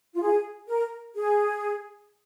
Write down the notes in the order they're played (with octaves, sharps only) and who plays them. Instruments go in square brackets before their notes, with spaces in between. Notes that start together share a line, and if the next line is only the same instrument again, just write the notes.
[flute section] F4
G#4
A#4
G#4